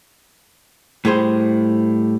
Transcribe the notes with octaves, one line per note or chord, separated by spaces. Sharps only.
A2 G3 G#4 C5